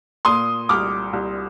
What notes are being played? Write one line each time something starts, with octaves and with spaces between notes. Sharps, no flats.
A#2 C6 D#6
C2 D6 F6
C2